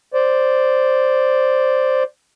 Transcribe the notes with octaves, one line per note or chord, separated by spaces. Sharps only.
C5 D5